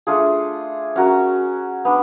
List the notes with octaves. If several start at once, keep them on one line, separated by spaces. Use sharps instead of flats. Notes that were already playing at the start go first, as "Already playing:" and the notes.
A3 D4 F4 G#4
C#4 F#4 A#4
B3 D4